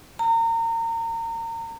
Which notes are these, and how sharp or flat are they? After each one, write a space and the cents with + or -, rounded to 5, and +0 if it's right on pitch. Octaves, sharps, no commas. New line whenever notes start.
A#5 -30